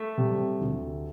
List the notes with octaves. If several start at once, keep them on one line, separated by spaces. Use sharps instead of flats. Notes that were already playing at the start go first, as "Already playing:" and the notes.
Already playing: A3
C3 G3
D2